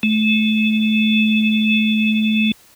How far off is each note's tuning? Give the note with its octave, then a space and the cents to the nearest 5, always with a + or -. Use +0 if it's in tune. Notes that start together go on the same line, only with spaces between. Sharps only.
A3 -25